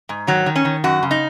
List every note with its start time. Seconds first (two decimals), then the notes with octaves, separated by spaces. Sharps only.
0.09 G#2
0.27 D#3 F#3
0.46 D#3
0.56 C#4
0.65 D#3
0.84 F#2 F#4
1.03 C#3
1.11 D#4